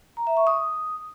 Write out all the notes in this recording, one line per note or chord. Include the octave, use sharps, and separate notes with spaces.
A#5
E5
C#6
D#6